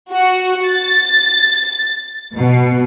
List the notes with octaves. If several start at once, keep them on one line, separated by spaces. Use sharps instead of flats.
F#4
A6
B2